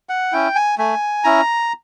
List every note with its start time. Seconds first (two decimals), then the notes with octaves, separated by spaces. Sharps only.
0.09 F#5
0.32 C#4 E4 G5
0.55 G#5
0.78 A3 G#5
1.24 C#4 E4 A#5